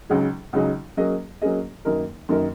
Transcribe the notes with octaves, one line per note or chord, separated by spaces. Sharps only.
C#2 C#3 F#3 D#4 G#4
C#2 C#3 F#3 D#4 G#4
F#3 A#3 C#4 G#4 D#5
F#3 A#3 C#4 G#4 D#5
F#2 D#3 A#3 D#4 A#4
F#2 D#3 A#3 D#4 A#4